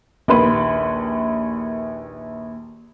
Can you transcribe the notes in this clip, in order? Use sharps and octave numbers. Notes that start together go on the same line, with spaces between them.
A#1 D#2 A#4 B4 C6